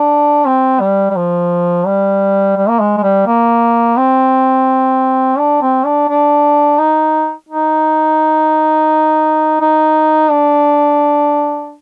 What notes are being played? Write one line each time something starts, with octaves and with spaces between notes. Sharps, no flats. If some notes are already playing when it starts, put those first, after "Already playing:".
Already playing: D4
C4
G3
G3
F3
G3
G3
A#3
G#3
G#3
G3
A#3
C4
D4
C4
D4
D4
D#4
D#4
D#4
D4